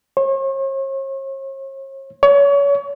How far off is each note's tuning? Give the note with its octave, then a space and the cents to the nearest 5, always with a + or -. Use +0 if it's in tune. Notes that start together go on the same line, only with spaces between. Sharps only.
C#5 -45
C#5 +30